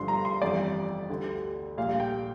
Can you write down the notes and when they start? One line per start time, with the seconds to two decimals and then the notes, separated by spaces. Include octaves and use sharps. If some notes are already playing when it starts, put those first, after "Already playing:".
Already playing: G1 G2 D3 F3 C6
0.08 A#5
0.25 C6
0.41 G1 F2 E3 G3 D5
1.09 D2 D3 G3
1.77 A#1 A#2 G3 F5
2.00 G5